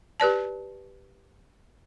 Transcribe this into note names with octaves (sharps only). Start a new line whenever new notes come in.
G4 B4 D5 A5